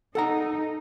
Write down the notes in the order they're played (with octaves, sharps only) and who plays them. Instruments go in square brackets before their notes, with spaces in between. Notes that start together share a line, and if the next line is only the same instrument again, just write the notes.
[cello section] D#4 [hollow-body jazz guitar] A4 F#5 A#5